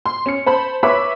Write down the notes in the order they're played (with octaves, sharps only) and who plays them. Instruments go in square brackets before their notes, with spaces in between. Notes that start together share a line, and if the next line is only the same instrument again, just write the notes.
[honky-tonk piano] C6
C#4 C#7
C5 A5 B5
B4 C#5 E5 B5 D6 B6